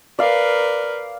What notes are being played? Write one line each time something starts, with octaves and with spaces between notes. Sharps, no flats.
A#4 B4 D5 F5